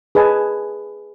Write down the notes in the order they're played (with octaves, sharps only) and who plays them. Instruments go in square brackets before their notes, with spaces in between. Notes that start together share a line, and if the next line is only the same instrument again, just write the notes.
[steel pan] G#4 B4 D#5 G#5 A5